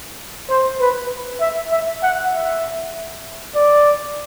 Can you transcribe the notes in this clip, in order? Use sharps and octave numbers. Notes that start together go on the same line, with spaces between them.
C5
B4
E5
E5
F#5
E5
D5